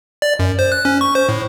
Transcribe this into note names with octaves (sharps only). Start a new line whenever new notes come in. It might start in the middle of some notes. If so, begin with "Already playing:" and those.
D5
F#2
C5
F#6
C#4
C#6
C5
A2